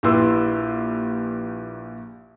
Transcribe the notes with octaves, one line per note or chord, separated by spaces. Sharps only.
A#1 E4 G4 B4 C6 E6